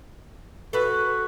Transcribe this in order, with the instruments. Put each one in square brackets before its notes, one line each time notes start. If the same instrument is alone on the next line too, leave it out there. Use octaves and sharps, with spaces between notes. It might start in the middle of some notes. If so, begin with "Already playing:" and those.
[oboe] F#4 [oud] A4 B4